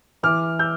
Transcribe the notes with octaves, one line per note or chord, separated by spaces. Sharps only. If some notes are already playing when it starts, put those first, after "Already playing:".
E3 D6 F6
E6 G6